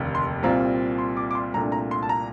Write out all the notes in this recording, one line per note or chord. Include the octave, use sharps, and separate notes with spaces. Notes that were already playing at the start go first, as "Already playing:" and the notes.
Already playing: F1 D#2 D3
C6
C2 A#2 G3 C4 F4 A#5
C6
D6
D6
C6
C2 A#2 A3 D4 A#5
A#5
C6
A5
A#5